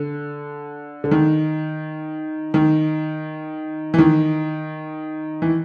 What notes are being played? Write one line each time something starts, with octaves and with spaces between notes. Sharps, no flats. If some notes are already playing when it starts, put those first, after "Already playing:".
Already playing: D3
D3
D#3
D#3
E3
D#3
E3